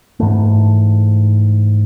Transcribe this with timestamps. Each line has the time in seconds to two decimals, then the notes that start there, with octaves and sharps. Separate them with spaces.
0.20 G#2 E3 A3